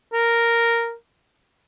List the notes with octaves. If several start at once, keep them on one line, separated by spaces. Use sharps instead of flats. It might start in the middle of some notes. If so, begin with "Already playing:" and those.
A#4